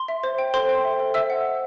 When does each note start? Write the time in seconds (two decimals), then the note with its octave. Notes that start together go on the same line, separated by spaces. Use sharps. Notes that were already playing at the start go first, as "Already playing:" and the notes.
Already playing: C6
0.08 E5
0.24 C5
0.39 G5
0.54 A4 C5 C6
0.69 G5
0.84 E5
1.00 A4
1.14 C5 E5 E6
1.30 F#5
1.45 D#5